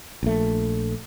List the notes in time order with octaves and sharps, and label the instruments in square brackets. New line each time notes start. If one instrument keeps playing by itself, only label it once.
[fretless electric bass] A#1 A3